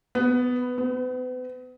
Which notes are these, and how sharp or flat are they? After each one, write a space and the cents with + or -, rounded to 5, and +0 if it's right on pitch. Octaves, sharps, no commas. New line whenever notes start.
B3 +10
B3 +40